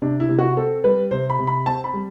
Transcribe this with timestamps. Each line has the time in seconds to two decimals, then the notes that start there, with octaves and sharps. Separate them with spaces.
0.02 C3 D4
0.20 E4
0.29 C3
0.38 F#4
0.57 C4 A4
0.84 G3 B4
1.11 C3 C5
1.30 B5
1.39 C3
1.47 B5
1.66 C4 A5
1.84 B5
1.93 G3